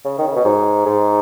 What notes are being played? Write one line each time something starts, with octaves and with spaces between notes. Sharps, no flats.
C#3
D#3
C#3
B2
G#2
G#2